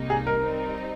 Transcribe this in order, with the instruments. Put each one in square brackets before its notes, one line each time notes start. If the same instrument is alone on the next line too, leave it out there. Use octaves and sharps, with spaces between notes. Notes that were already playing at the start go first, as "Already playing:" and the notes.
Already playing: [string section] C2 C3 G3 A#3 D#4
[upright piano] G#4
A#4
[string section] G3 C4 D#4